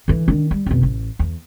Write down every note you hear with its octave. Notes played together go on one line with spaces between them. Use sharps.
D3 E3
D#3 D4
G3
F1 B2
A1
E2